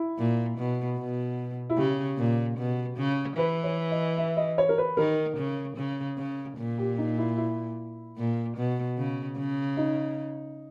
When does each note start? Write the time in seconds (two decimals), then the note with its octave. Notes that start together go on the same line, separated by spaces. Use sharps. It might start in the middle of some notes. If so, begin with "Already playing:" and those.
Already playing: E4
0.18 A#2
0.58 B2
0.98 B2
1.70 E4
1.77 C#3 G4
2.18 A#2
2.58 B2
2.97 C#3
3.37 E3 B4
3.64 C#5
3.91 D#5
4.18 E5
4.37 D#5
4.58 C#5
4.69 A#4
4.78 B4
4.97 D#3 A#4
5.37 C#3
5.77 C#3
6.18 C#3
6.57 A#2
6.78 G4
6.98 D#4
7.18 E4
7.37 E4
8.18 A#2
8.57 B2
8.97 C#3
9.38 C#3
9.77 D#4